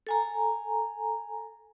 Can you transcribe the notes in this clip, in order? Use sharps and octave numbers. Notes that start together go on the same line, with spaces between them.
A4 G#5 A#5